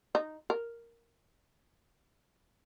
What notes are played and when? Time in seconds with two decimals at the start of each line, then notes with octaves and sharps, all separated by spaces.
0.15 D#4
0.50 A#4